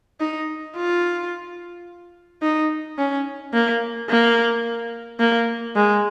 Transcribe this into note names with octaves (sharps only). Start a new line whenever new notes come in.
D#4
F4
D#4
C#4
A#3
A#3
A#3
G#3